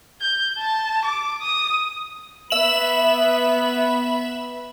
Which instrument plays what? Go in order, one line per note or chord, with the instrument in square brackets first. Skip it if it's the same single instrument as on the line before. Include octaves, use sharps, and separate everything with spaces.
[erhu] G6
A5
D6
D#6
[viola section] B3 B4 B5 [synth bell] E5 E7 F#7